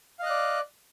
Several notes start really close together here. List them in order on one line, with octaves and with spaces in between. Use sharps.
F5 D#5 F#6 D5